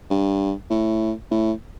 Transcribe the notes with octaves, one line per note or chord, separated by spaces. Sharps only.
G2
A2
A2